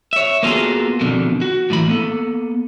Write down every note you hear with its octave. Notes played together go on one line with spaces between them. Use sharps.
C#5 E5
A#3 B3 F4 F#4 G#4 A4
F2 B2 D3 D#3
F#4
A2 E3 B5
A#3 B3 A4